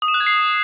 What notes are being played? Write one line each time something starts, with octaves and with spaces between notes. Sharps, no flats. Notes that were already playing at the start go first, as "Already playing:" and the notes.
D#6
E7
F#6
G#6
C7